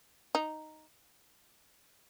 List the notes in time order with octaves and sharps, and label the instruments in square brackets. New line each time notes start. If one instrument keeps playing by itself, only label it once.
[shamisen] D#4